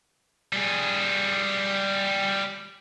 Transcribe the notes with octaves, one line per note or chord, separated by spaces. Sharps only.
G3 G#4